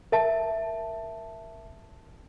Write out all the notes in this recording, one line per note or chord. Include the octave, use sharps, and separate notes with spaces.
A#4 E5 A5